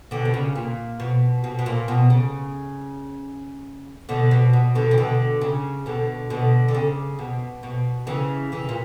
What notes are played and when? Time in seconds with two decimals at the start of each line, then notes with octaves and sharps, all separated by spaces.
0.11 B2 D3
0.25 B2
0.34 C#3
0.55 A#2
1.00 B2
1.44 B2
1.59 B2
1.66 A#2
1.88 B2
2.10 C#3
4.09 B2 D3
4.31 B2
4.53 B2
4.75 B2 D3
4.91 E3
4.98 B2 D3
5.41 C#3
5.86 B2 D3
6.30 B2 D3
6.68 D3
6.75 C#3
7.19 B2
7.63 B2
8.07 C#3 E3
8.52 C#3 E3
8.69 A#2